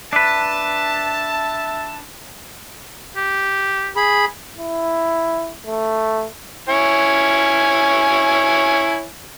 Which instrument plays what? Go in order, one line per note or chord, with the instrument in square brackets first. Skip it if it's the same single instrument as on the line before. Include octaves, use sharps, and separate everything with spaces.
[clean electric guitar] D4 B4 [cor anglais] E5 [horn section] A5
[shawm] G4
[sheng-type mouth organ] G#4 B5
[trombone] E4
A3
[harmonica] E4 C#5 G#5